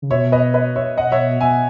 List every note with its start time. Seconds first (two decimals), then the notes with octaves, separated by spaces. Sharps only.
0.02 C#3
0.11 B2 C#5 E5
0.32 B4 D#5
0.54 B4 D#5
0.76 C#5 E5
0.97 D#5 F#5
1.12 C#5 E5
1.41 B2 E5 G#5